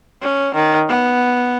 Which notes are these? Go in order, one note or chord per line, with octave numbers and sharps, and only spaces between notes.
C#4
D#3
B3